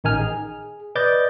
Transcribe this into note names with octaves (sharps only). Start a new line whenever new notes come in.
A1 D#3 D#4 G#5 F6
G#4
B4 D5 D#5 D6 G6 A6